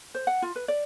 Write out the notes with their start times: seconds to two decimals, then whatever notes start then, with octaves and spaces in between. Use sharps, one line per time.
0.15 C5
0.27 F#5
0.42 F4
0.56 B4
0.68 D5